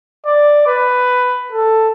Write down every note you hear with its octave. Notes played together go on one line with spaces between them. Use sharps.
D5
B4
A4